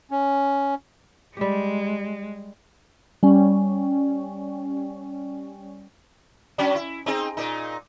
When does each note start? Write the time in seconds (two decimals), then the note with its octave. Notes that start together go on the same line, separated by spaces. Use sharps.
0.11 C#4
1.37 G3 G#3 G4
3.23 G3 C#4
6.58 F#3 C#4 D4
6.75 E4
7.06 C4 D#4 G#4
7.37 A#2 D#4